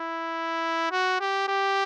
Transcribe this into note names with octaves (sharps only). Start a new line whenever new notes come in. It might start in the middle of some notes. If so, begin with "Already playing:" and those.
Already playing: E4
F#4
G4
G4